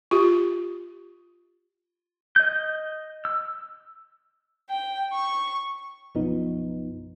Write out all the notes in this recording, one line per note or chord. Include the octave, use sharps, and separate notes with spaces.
F4 G4
D#5 G6
E6
G5
C#6
B1 F#2 F3 B3 D#4